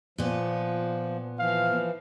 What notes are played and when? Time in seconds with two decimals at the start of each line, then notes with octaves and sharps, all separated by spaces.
0.18 A#2 F3 B3
1.39 E3 F3 F5